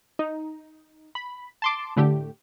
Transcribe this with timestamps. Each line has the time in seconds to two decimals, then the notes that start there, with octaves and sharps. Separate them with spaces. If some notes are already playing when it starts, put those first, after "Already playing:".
0.19 D#4
1.15 B5
1.62 A5 C6 D6
1.96 A2 D3 A3 G4